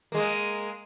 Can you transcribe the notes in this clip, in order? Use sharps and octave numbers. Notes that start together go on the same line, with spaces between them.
G#3 A#3